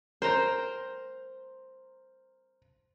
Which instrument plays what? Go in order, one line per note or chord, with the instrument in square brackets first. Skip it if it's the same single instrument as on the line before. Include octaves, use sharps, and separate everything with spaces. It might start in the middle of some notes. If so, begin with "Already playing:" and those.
[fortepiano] A#4 [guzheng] C5 G5 A#5